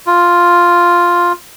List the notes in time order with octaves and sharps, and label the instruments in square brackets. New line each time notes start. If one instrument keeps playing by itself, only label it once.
[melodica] F4